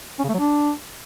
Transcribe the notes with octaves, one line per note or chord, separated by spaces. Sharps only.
C#4
C#3
A3
F#3
D4